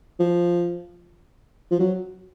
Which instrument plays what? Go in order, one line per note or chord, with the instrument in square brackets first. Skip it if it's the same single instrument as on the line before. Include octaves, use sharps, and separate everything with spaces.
[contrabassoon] F3
F3
F#3